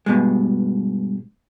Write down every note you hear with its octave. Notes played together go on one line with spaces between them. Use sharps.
G2 B2 G#3